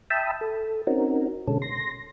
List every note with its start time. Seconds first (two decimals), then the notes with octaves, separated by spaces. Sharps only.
0.10 E5 G5 A5 B5 D#6 E6
0.41 A4
0.87 C4 C#4 D#4 F#4 A#4
1.47 B2 D3 G#3 C#4 A4
1.62 C6 A#6